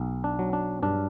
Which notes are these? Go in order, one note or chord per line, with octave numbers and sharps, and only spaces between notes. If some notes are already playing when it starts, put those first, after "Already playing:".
Already playing: B1
D4
F#3
D4
G2 D4